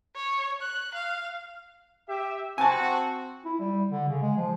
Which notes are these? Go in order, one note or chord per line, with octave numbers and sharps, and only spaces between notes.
C#5
F#6
F5
G4 E5
C4 F#4 G#5 A5
E4
G3
D3
C#3
G#3
F3